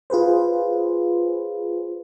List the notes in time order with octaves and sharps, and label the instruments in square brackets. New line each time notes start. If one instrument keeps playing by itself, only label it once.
[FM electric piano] F4 G#4 B4 C5